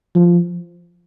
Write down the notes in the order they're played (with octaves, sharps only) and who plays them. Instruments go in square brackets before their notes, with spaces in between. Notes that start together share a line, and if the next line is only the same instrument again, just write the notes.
[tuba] F3